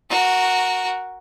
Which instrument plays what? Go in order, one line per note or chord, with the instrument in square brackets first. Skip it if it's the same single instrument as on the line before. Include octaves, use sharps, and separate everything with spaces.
[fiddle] F#4 A#4